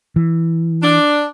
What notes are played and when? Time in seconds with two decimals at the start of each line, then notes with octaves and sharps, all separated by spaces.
0.16 E3
0.82 D4